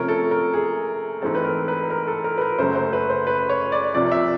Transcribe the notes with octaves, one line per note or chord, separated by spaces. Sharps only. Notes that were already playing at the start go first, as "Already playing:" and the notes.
Already playing: C3 F3 A3 C#4 A#4
A4
A#4
G#4
G#2 E3 A3 C4 A4
B4
A#4
B4
A#4
A4
A#4
B4
A#4
F#2 C#3 F#3 A3 C5
C5
B4
C5
B4
C#5
D5
C2 C3 F3 D5
E5